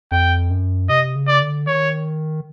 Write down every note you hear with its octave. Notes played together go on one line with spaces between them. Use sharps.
F2 G5
F#2
C3 D#5
C#3
D5
D3
D#3 C#5